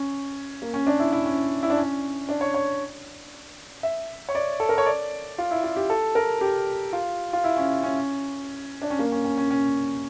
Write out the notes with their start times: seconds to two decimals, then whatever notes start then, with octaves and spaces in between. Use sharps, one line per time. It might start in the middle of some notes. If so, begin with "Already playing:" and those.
Already playing: C#4
0.62 A#3
0.74 C#4
0.87 D4
1.00 E4
1.13 E4
1.25 C#4
1.63 E4
1.70 D4
1.77 C#4
2.29 D4
2.41 C#5
2.54 C#5
3.83 E5
4.29 C#5
4.35 D5
4.60 A4
4.69 A#4
4.78 C#5
4.86 D5
5.38 F4
5.51 E4
5.64 F4
5.76 G4
5.90 A4
6.15 A#4
6.41 G4
6.93 F4
7.33 F4
7.44 E4
7.57 C#4
7.83 C#4
8.82 D4
8.90 C#4
8.99 A#3
9.12 C#4
9.25 C#4
9.38 C#4
9.51 C#4